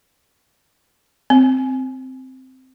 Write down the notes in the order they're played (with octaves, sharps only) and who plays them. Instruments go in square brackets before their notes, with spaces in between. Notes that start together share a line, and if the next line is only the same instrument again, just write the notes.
[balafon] C4